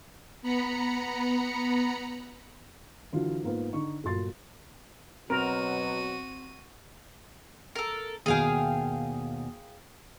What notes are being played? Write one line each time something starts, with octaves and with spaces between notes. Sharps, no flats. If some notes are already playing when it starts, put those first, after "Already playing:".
B3 A#5 B5 C#7
D3 E3 F#3 F4
G#2 A#3 B3 F4
D3 D#4 C#6
G1 A#2 F#3 C6 A6
B2 F#3 C4 F#4 A#4 D#7
A4 A#4
D#2 B2 G#4 F5 G5 G#5